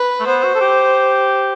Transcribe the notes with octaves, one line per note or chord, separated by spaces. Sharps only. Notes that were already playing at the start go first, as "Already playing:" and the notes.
Already playing: B4
A3
B3 C5
F#4
A4
G4